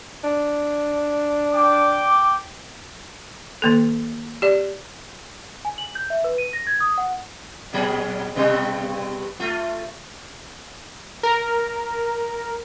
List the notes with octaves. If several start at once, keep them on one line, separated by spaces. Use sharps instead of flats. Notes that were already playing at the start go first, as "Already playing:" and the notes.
D4
G5 D6
D#3 A#3 A4
G4 D5
G#5
F#7
G6
E5
B4
D#7
A#6
G#6
D#6
F#5
A#2 F#3 G#4
G2 B2 G3
A3 F4
A#4